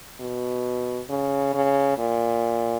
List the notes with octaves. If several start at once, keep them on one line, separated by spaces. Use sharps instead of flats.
B2
C#3
C#3
A#2